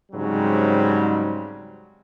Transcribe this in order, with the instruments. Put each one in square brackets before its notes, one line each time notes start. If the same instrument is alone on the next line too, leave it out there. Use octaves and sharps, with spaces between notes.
[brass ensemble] G#2 C#3 F#3 G3 C4